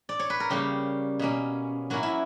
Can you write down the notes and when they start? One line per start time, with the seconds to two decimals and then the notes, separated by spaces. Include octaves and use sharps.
0.09 D5
0.19 C#5
0.30 B4
0.40 A#4
0.50 C#3 G3 A#3 G4
1.19 B2 A#3 C#4
1.90 F#3 A#3 C#4 E4 F#4
2.03 E4